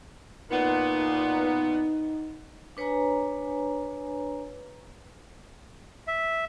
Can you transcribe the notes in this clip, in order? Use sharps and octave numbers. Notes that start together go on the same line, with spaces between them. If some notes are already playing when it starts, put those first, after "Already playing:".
A#2 B3 D#4
D4 B4 C#5 G#5 A#5
E5